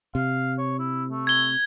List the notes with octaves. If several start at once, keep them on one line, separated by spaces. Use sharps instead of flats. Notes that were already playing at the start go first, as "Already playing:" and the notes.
C3 F5
C#5
E4
A3
G#6 G7